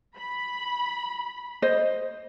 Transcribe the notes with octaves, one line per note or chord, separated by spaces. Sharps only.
B5
C5 D#5